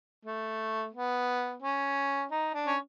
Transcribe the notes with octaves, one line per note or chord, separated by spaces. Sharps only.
A3
B3
C#4
D#4
D4
C#4